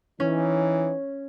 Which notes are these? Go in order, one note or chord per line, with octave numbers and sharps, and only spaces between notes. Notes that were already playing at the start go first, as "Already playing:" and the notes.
E3 C#4 D#4